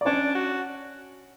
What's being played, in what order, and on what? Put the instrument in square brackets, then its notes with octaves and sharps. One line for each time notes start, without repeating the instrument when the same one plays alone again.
[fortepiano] D5
[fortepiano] C#4 C#5 [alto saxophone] D4
[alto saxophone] F#4